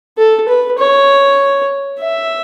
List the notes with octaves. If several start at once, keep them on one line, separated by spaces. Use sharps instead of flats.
A4
B4
C#5
E5